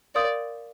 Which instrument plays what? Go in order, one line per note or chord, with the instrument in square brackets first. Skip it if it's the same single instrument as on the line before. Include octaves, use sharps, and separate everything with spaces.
[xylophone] A#4 F5 C6 D#6 G6 [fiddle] D5